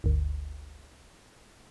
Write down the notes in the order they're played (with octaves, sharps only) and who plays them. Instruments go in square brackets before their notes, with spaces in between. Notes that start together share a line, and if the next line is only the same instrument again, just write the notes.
[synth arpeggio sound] G1 D2